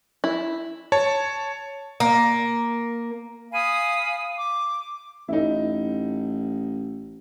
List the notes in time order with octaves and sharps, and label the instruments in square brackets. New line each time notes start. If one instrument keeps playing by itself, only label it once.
[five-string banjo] E4
[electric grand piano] C#5 A5
[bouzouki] A#3
[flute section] F5 G#5 B5 D#6
D6
[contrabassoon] A1 [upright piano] D#4 E4